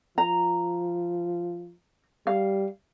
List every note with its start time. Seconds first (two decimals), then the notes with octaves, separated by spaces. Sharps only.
0.18 F3 A#5
2.27 G3 F5